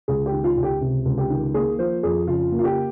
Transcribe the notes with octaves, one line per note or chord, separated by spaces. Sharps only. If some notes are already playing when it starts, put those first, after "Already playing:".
C#2 G#4
G4
D#3
F4
C#2
G4
C3
C#2
G4
D#3
A#3 G#4
F3 C5
F2 G#4
C#3 F4
A#3
F4
G4